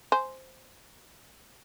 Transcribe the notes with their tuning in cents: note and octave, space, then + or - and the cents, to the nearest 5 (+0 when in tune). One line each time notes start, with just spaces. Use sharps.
C5 +0 G#5 +0